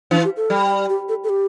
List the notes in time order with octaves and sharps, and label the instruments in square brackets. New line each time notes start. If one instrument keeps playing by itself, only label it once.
[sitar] E3 [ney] D4
[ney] G4
A4
[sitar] G3
[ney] G4
A4
A4
G4